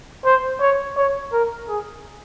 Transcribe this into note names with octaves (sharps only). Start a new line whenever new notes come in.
C5
C#5
C#5
A#4
G#4